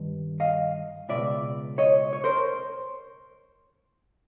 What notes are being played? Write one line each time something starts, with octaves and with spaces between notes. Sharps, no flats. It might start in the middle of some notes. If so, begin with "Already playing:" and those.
Already playing: G2 D#3
D#5 F5
C#2 B2 D5 E5
C#5 D#5
C#5
A#4 C5